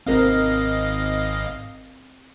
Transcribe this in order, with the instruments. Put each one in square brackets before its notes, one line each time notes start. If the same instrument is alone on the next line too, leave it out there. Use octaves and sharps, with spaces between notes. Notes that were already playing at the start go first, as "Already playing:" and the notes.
[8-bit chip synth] G#1 D#5 F5 [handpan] C4 A#4